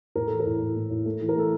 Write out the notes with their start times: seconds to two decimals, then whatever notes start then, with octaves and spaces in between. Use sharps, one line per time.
0.16 A2 A#4
0.27 E3 A4
0.40 A#4
0.46 A2
0.61 A2
0.76 A2
0.90 A2
1.06 A3
1.21 E3
1.29 A#4
1.36 A3 A4